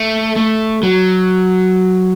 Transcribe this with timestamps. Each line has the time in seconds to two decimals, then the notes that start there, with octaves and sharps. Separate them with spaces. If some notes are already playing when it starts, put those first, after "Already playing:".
Already playing: A3
0.36 A3
0.83 F#3